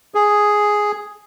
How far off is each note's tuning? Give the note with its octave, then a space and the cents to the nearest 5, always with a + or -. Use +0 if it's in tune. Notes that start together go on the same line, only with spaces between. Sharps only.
G#4 +0